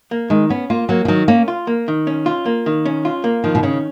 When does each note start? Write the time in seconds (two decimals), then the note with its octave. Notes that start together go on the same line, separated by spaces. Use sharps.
0.11 A#3
0.30 D#3 G#3
0.50 B3 C#4
0.70 A#3 F4
0.89 F#3 A#3
1.05 F3
1.08 D#3 F#3
1.28 A#3 C#4
1.48 F4
1.67 A#3
1.88 D#3
2.07 C#4
2.26 F4
2.46 A#3
2.66 D#3
2.85 C#4
3.05 F4
3.24 A#3
3.44 D#3 F3
3.55 B2
3.63 C#3 C#4